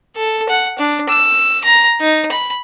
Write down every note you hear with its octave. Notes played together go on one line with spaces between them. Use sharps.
A4
F#5
D4
E6
A#5
D#4
B5